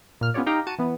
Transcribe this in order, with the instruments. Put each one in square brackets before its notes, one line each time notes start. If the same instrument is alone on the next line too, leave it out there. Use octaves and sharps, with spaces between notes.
[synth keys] A#2 F6
B3 C#4 F4 G4 C#5 D5
D#4 G4 F5 G5 A#5
F#4 A5 C#7 D#7
E3 B3